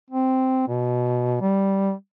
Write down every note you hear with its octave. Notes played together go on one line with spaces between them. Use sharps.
C4
B2
G3